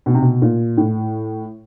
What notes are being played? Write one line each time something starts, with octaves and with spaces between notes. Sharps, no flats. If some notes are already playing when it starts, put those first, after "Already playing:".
B2
C3
B2
A#2
A2